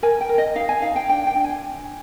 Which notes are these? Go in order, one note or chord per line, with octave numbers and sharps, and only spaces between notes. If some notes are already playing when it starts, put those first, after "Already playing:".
A#4 G#5
G5
A#4
D#5
D#4 F5
G#5
D#4 F5
G5
D4 G5
G5
D4
G#5